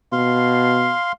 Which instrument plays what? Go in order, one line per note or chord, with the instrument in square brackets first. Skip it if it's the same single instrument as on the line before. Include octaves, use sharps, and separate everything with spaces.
[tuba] B2 [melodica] F5 C6